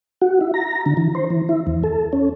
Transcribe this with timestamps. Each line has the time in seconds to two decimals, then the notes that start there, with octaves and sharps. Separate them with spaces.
0.21 F#4
0.41 E4
0.54 A#5
0.86 D3
0.97 E3
1.15 C5
1.30 E3
1.49 E4
1.67 E2
1.83 A4
2.13 C#4